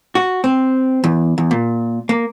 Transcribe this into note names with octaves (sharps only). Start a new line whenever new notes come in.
F#4
C4
E2
E2
A#2
A#3